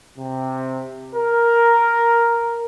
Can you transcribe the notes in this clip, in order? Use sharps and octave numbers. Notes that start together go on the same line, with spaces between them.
C3
A#4